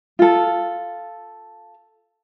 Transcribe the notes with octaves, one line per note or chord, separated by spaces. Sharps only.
F4 A4